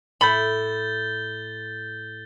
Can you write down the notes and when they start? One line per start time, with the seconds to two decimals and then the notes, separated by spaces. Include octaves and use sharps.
0.21 A2 B5 G6 A6 G7